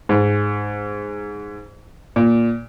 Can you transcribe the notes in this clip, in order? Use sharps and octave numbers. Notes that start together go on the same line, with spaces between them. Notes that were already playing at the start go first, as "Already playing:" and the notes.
G#2
A#2